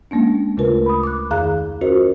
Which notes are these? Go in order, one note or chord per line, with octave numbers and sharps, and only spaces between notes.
G#3 A#3 C#4 D4
D2 C#3 A3 F4 A#4 B4
B5 D#6
D6 F#6
F2 D#3 G#4 F5 A#5 F#6
C#4 F4 F#4 A#4 C5 D#5